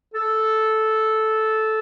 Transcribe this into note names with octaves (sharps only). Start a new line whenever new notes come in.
A4